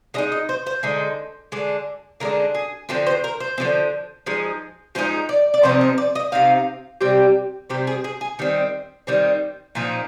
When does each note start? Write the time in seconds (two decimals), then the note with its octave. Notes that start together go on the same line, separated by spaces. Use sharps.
0.14 D3 G#3 D#4 D#5
0.32 D#5
0.49 C5
0.67 C5
0.83 D3 G#3 D#4
1.52 D3 G#3 D4
2.20 D3 G#3 D4 A#4
2.55 G#4
2.89 D3 F3 C4 C5
3.07 C5
3.24 A#4
3.40 C5
3.58 D3 F3 C4
4.26 F3 G#3 D#4
4.95 F3 G#3 D#4 C5
5.29 D5
5.54 D5
5.63 C3 F3 C4 D#4 C5
5.81 A#4
5.98 D5
6.15 D#5
6.32 C3 F3 C4 D#4 F5
7.01 C3 G3 C4 G4
7.70 C3 G3 C4 G4
7.87 G#4
8.04 G#4
8.21 G#4
8.39 D#3 G3 C4
9.07 D#3 G3 C4
9.75 A#2 F3 C4 D#4